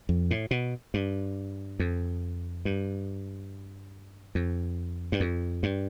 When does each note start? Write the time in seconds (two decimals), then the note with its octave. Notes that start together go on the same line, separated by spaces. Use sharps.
0.09 F2
0.31 A2
0.51 B2
0.94 G2
1.80 F2
2.65 G2
4.35 F2
5.12 G2
5.20 F2
5.63 G2